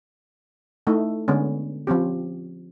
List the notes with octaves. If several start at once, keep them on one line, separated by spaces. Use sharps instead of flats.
A3 D#4 E4
D3 G#3 B3 C#4
F3 C4 C#4 G4